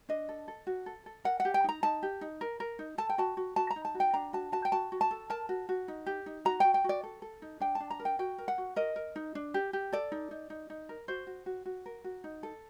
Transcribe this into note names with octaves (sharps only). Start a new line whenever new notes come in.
D4 D#5
A4
A4
F#4
A4
A4
A#4 F#5
F#5
G4
G5
D#4 A#5
D#4 A5
G4
D#4
A#4
A#4
D#4
A4 A5
G5
F#4 A5
F#4
F#4 A5
A#5
D#4
A5
F#4
G5
D4 A#5
F#4 A5
F#4 A5
G5
F#4 A5
F#4
A5
A4
A#4 A5
F#4
F#4
D#4
G4
D#4
F#4 A#5
F#4 G5
G5
F#4 D5
A4
A4
D#4
D4 G5
A5
D4
A#5
A#4
G5
F#4 G5
A#4
F#5
F#4
A#4 D#5
A#4
D#4
D4
G4
G4
A4 D5
D#4
D#4
D#4
D#4
A#4
F#4 C5
F#4
F#4
F#4
A#4
F#4
D#4
A4